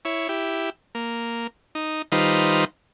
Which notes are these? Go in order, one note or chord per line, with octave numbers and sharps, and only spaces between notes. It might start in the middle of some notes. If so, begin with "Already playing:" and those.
E4 C#5
E4 G4
A#3
D#4
D#3 G3 D#4 F4 B4 C5